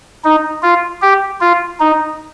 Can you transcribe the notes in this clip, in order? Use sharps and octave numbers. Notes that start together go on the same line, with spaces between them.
D#4
F4
G4
F4
D#4